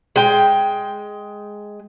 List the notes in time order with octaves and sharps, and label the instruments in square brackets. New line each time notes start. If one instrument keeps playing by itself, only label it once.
[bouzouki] G#3 G5